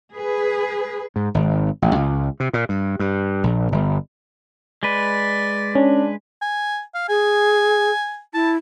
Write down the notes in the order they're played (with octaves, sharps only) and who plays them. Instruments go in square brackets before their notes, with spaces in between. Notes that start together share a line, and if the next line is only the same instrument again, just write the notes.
[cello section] G#4 B4
[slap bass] G#2
G#1
A1
C#2
C3
A#2
G2
G2
A#1
G1
[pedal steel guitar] G#3 B4 [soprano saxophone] D5
[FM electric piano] C#4 [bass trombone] D4
[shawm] G#5
F5
[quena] G#4 [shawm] G#5
[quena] E4 [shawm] A5